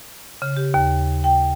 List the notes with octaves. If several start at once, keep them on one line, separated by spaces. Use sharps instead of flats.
C#3
G4
D#2
G5